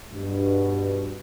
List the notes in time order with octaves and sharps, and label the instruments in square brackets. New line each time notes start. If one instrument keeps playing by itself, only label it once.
[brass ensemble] G2 B2